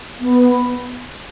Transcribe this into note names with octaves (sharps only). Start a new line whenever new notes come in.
B3